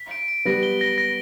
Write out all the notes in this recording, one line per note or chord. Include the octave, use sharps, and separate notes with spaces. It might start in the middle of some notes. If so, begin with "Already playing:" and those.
Already playing: B6
D7
D7
G3 B3 A#6
G7
A#6
A#6